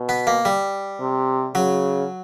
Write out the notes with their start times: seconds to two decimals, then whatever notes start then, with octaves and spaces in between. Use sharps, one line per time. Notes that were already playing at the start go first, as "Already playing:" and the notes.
Already playing: B2
0.09 B3
0.27 A#3
0.45 G3
1.00 C3
1.55 C#3 F#3